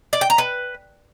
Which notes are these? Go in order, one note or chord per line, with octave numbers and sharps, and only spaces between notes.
D5
G5
A#5
B4